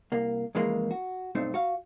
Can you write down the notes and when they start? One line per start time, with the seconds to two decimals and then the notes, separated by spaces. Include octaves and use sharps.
0.12 C2 A#3
0.55 F2 C#3 E3 G#3 A#3
0.91 F#4
1.35 B1 G2 A3 C4 D#4
1.54 F#4 F5